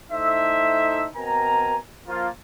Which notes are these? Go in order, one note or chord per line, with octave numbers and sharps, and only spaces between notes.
A3 D#4 E4 A4 C5 E5
B2 C4 A#4 G#5 A#5
F3 A#3 F4